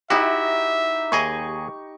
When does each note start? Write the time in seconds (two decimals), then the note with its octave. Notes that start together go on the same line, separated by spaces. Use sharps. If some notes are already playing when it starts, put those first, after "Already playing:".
0.10 D#4 E4 F#4 G4 E5
1.12 D#2 G#4 D#5 C#6